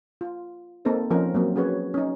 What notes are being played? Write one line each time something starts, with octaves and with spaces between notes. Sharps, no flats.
F4
A#3 C4 D#4 A4 C5
F3 C4 C#4 D#4 F4 A#4
F#3 A#3 C4
C#4 F#4 G#4 B4 C#5
C#4 D#4